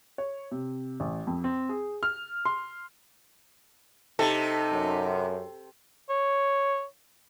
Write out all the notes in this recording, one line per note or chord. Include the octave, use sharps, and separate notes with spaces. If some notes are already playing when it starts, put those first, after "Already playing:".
C#5
C3
A1
F2
C4
G#4
F6
C6
C3 D#4 A4
F#2
C#5